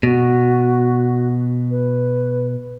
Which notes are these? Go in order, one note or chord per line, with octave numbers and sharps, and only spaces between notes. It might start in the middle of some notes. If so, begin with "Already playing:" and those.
B2 F#4
B4